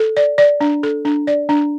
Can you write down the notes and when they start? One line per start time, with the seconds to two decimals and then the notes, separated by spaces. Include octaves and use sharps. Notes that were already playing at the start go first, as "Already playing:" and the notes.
Already playing: A4
0.17 D5
0.38 D5
0.61 D4
0.83 A4
1.05 D4
1.27 D5
1.49 D4